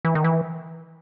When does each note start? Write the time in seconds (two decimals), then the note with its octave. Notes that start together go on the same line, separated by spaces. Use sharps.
0.05 E3
0.15 D#3
0.24 E3